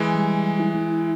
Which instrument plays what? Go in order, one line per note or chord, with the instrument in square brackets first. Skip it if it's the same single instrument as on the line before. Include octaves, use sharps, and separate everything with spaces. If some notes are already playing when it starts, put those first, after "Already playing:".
Already playing: [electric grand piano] E3 G#3
[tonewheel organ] G3
E4